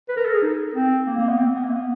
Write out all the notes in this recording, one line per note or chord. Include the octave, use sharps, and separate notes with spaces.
B4
A#4
A4
G#4
D#4
C4
A#3
A#3
B3
C4
B3
A#3
B3